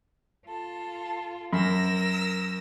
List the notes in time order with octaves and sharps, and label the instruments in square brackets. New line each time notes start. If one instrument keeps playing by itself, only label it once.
[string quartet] F4 A4
[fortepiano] F#2 [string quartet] A#4 E6 A#6